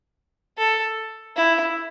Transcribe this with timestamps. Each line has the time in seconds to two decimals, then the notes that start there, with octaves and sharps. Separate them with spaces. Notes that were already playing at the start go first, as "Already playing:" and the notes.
0.58 A4
1.37 E4